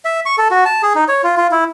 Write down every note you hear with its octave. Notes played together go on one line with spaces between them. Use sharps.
E5
C#6
A4
F#4
A5
G#4
D#4
C#5
F4
F4
E4